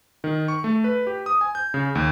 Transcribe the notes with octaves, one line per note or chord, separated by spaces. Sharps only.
D#3
C#6
A3
B4
G4
D#6
G#5
G6
C#3
D#2